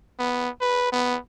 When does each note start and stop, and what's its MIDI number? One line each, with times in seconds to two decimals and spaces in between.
0.19 0.49 59
0.61 0.89 71
0.93 1.18 59